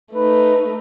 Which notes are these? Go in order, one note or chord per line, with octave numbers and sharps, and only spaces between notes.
A3 D#4 B4